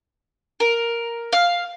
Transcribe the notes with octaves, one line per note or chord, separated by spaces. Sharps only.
A#4
F5